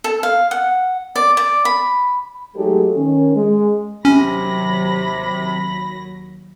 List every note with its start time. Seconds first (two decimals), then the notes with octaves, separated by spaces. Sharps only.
0.04 A4
0.23 F5
0.51 F#5
1.16 D5
1.37 D5
1.65 B5
2.55 F#3 G#3 A3 D#4 G4 A4
2.96 D#3 C#4
3.36 G#3
4.05 D#2 C3 F#3 C#4 B5 A#6